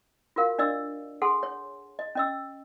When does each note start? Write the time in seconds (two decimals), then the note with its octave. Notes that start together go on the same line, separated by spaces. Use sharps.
0.36 F4 F#4 A#4 F5
0.59 D4 D5 D#5 E6
1.22 G#4 A4 F#5 G#5 C6
1.43 C#5
1.99 D#5
2.15 C#4 D#5 E6